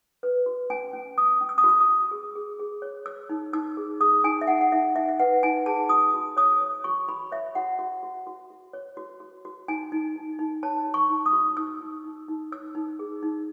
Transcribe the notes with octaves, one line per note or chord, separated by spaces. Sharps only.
B4
F#4
C#4 G#5
C#4
C#4 D#6
C#4
E6
D#6
F#4 E6
D#6
C#4
G#4
G#4
G#4
C#5
C#5 E6
D#4
D#4 E6
G#4
G#4 D#6
D#4 G#5
E5
D#4 F#5
F#5
D#4 E5
D#4 E5
E5
B4 F#5
D#4 G#5
G#4 A5
F#4 D#6
F#4
C#5 D#6
C#5
F#4 C#6
F#4 B5
C#5 E5
F#4 F#5
F#4
F#4
F#4
F#4
C#5
F#4
F#4
F#4
D#4 G#5
D#4
D#4
D#4
C#5 A5
F#4
C#6
D#4
D#6
F#4
D#4 E6
D#4
D#4
D#4
C#5 E6
D#4
G#4
D#4